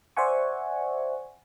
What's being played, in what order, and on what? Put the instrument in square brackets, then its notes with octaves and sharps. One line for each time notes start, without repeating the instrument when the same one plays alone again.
[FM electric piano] C5 D5 E5 F#5 G#5 C#6